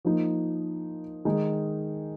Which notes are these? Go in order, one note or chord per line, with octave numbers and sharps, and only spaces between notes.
F3 A#3 D#4
D#3 G#3 D#4 G#4